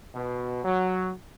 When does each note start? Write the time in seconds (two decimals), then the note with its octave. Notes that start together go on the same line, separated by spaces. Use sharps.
0.15 B2
0.65 F#3